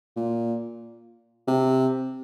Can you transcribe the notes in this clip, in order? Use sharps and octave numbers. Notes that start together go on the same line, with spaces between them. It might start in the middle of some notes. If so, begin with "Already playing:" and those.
A#2
C3